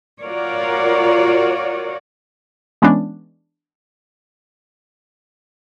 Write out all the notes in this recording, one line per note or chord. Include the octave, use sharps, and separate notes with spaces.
F4 F#4 A#4 C#5 D5
E3 G#3 B3 C#4 D4